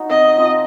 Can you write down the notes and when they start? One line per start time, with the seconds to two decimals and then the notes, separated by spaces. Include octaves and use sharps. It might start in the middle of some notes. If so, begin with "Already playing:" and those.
Already playing: D#4 F#4
0.10 C3 D#5
0.36 F3 C4